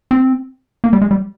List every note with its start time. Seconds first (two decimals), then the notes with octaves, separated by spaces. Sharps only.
0.11 C4
0.84 A#3
0.93 G3
1.02 G#3
1.11 G3